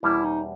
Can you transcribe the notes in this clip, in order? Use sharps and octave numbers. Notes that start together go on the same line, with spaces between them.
E2 B2 G3 A#3 C#4 E4
D#4